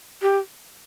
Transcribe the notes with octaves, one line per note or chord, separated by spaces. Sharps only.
G4